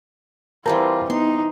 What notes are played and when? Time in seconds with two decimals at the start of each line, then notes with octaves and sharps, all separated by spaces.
0.66 E3 G3 C4 F4 A#4 A5 A#5
1.10 B3 D#4 C6